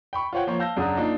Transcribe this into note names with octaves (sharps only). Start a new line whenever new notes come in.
G5 B5 C#6
F4 C5 C#5 F#5 G5
F3 A#3 C5 C#5
F5 A5 E6 G6 A#6
F#2 C#3 F#3 D4 F#4 D#6
A#3 D4 D#4 F4